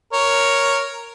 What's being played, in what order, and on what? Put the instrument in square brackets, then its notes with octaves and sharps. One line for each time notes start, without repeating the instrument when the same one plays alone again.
[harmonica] A#4 C#5